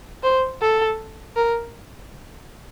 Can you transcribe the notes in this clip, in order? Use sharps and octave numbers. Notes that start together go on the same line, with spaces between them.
C5
A4
A#4